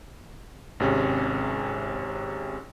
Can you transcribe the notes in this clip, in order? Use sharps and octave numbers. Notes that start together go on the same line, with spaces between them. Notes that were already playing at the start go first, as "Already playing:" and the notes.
G#1 C3 C#4 G#4